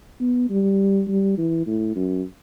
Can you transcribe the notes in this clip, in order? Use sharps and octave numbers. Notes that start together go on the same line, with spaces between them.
B3
G3
G3
E3
A2
F#2